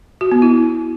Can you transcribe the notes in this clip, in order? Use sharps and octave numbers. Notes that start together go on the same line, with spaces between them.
F#4
B3
E4